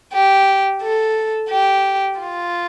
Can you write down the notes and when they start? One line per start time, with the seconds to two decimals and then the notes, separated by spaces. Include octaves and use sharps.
0.13 G4
0.82 A4
1.50 G4
2.20 F4